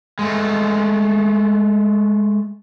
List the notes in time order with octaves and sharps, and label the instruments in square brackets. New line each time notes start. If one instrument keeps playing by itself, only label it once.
[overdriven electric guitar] G#3 A3